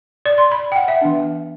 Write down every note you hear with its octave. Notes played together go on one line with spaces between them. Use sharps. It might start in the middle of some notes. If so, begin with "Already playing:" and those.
D5
C6
B5
G5
F#5
E5
E3 B3 D4